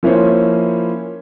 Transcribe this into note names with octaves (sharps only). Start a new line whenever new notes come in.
F3 A#3 C#4 E4 C5 C#5